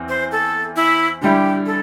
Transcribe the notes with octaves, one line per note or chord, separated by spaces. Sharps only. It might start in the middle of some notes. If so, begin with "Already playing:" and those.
Already playing: E2 C4
C5
A4
E4
D3 G3 E4 G4
A4